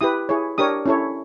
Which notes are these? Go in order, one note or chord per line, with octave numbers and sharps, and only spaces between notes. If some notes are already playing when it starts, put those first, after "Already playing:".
E4 G4 B4 D#6
E4 G#4 C#5
D4 G4 A#4 C#5 D#6
C#4 E4 A4 C#5